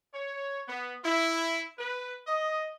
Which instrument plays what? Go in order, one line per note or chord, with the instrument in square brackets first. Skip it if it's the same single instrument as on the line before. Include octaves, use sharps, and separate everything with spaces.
[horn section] C#5
B3
E4
B4
D#5